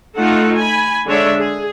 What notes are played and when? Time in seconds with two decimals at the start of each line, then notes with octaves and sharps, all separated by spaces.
0.17 A3 D#4 F4 F#5
0.57 G#5 B5
1.06 D3 G#3 D4 C#5 E5
1.39 G#4